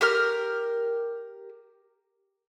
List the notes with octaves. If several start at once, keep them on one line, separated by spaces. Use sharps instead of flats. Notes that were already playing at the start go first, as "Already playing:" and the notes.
G4 A#4 F6